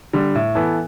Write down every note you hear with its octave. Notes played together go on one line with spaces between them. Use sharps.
D3 G3
A2
E3 B3 E4 A4